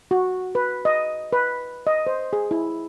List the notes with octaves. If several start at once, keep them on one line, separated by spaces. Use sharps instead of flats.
F#4
B4
D#5
B4
D#5
C5
G#4
E4